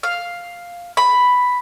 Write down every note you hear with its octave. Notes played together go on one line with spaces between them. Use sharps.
F5
B5